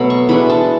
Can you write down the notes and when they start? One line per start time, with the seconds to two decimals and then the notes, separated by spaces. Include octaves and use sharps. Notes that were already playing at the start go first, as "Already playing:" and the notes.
Already playing: B2 F#3 A3 B5
0.10 C#6
0.29 E3 G#3 D4 B5
0.50 A5